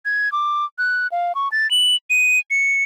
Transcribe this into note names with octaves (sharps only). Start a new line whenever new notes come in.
G#6
D6
F#6
F5
C#6
A6
F#7
D#7
C#7